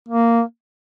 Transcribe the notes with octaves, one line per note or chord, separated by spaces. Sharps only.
A#3